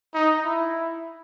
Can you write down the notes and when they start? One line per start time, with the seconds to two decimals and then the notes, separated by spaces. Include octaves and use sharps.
0.14 D#4
0.45 E4